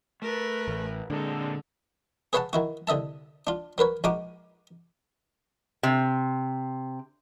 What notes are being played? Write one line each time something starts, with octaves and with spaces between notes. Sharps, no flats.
A3 A#4 B4
A1
A#2 D3 G#3 C4 A4
G#4 B4 C#5 F5 F#5 A5
D#3 E4 F#4
C2 D3 D#5 E5 A5
D4 F4
F#3 A#4 B4 C#5
A#1 G#3 D#4 F#4 D6
C3